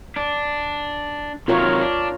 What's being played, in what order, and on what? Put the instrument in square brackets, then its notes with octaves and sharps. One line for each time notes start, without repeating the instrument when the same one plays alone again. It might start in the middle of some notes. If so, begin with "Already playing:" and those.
[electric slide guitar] D4
[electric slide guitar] C3 D#3 F#3 [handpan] F4 A#4 C#5
[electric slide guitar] D4